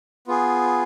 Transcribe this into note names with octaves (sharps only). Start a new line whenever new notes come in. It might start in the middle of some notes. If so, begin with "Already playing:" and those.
B3 F4 G#4